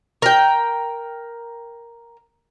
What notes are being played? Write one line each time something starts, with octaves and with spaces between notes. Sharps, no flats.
A#4 G5